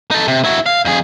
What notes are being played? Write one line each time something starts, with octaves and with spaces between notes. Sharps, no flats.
D#4 A4
C3
E4 F#4
F5
F2 G#4